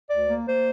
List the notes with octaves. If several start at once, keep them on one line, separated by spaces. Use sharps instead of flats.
D2 D5
A#3
A#3 C5